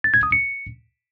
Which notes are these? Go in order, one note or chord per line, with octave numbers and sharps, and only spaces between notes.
A6
G#6
D#6
C#7